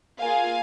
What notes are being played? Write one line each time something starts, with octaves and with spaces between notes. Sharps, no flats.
A#3 F4 G#4 F5 G#5